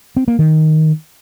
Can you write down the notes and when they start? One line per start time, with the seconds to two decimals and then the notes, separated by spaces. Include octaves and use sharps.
0.16 C4
0.28 A#3
0.39 D#3